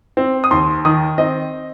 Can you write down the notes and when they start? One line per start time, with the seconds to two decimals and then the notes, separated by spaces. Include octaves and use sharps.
0.17 C4
0.44 D#6
0.51 D#2 C6
0.85 D#3 D#6
1.18 C4 D#5